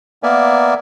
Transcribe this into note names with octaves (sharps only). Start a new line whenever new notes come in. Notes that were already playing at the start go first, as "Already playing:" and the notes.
A#3 B3 A#4 D5 E5 G#5